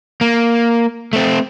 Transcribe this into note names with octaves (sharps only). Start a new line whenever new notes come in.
A#3
A3 C4